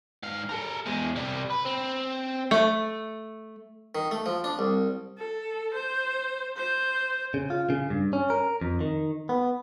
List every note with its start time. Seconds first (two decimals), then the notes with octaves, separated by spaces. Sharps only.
0.23 G#2 F5
0.49 A4 A#4
0.86 E2 G#3
1.16 C3 G3
1.51 B4
1.66 C4
2.51 A3
3.95 D#3
4.11 A3
4.26 F3
4.44 D4
4.59 C2
5.18 A4
5.73 C5
6.57 C5
7.34 C#3
7.50 F4
7.70 C#3
7.90 G2
8.13 C#4
8.30 A#4
8.61 F2
8.81 D#3
9.29 B3